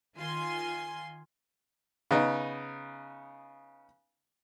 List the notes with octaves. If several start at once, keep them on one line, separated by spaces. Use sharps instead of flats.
D#3 F4 G#5 C6
C#3 B3 D#4